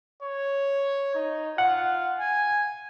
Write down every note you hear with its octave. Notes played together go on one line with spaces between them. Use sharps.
C#5
D#4
F4 F#5
G#5